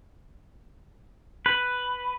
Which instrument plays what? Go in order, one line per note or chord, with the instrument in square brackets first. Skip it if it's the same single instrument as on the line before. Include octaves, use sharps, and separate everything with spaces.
[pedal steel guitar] B4